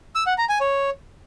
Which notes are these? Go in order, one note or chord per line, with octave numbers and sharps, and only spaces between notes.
E6
F#5
A#5
G#5
C#5